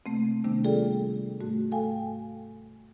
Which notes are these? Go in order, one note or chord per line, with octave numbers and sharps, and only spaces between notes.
C3 A3 A#3 C4
C3 D#3 G3 A3 B3 D4
F4 G#4 A4 D5 G5
G#2 A3 F#4
A4 F5 G5 G#5